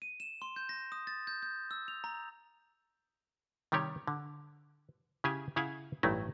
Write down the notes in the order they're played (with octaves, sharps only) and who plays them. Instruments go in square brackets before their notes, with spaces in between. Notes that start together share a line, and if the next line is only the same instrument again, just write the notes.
[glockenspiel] D#7
E7
C6
G6
A#6
D#6
A6
G6
G6
E6
F7
A#5
[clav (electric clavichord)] C3 D#3 G3 G4 C#5
D3
C#3 E4 G4 G#4 G#5
C#3 E4 F5 F#5 G#5
A1 G2 F#3 A3 D#4 E4